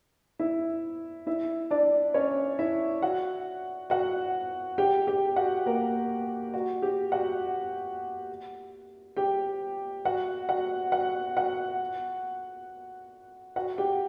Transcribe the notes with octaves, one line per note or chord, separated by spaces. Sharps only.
E4 E5
E4 E5
D4 D5
C#4 C#5
E4 E5
F#4 F#5
F#4 F#5
G4 G5
G4 G5
F#4 F#5
A#3 A#4
F#4
G4
F#4 F#5
G4 G5
F#4 F#5
F#4 F#5
F#4 F#5
F#4 F#5
F#4 F#5
G4 G5